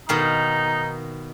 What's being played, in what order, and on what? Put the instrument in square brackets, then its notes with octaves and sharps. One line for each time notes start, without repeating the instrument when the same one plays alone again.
[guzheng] B2 D#3 F5 [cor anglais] D#4